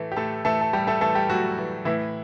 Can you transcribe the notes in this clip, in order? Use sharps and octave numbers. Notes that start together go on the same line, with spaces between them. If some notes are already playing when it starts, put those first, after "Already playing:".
Already playing: A2 E3 A3
G4
A2 A3 A4
E3 A3 A4
A4
A2 G3 G4
A3 A4
E3 A3 A4
G3 G4
A2 F#3 F#4
E3
A2 E3 E4